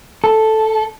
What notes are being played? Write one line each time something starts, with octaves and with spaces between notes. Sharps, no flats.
A4